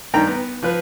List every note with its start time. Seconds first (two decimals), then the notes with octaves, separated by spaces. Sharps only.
0.13 G2 D#3 G5 A#5
0.27 B3
0.63 F3 B4